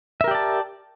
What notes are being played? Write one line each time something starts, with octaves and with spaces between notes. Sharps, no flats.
G4 A#4 D5 E5 A5